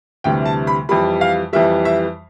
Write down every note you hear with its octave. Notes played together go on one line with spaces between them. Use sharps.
D2 C3 E3 G3 G5
A5
B5
F2 E3 G3 B5
F5
F2 E3 G3 E5
E5